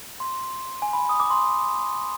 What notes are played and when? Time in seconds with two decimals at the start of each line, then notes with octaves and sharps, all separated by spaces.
0.20 C6
0.82 G#5
0.93 B5
1.09 D#6
1.20 D6
1.30 C6